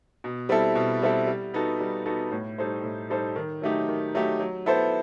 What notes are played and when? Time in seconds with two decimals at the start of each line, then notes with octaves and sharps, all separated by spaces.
0.24 B2
0.49 G3 C4 E4 A4
0.75 B2
1.02 G3 C4 E4 A4
1.27 G3
1.54 B3 D#4 F#4 A4
1.80 G3
2.06 B3 D#4 F#4 A4
2.32 A2
2.58 G3 D#4 A4 C5
2.83 A2
3.10 G3 D#4 A4 C5
3.36 D#3
3.62 F#3 A3 D#4 G4
3.88 D#3
4.15 F#3 A3 D#4 G4
4.40 F#3
4.66 B3 E4 A4 C5